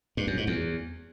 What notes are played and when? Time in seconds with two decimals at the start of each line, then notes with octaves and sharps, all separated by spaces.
0.17 G2
0.27 F#2
0.37 G#2
0.47 E2